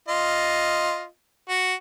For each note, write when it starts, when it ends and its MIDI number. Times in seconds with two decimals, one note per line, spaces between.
0.08 1.06 65
0.08 1.06 75
1.49 1.74 66